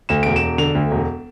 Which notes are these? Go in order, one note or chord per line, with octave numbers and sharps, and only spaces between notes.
D2 E7
E1 D7
E7
E1
D3 F7
D2
E1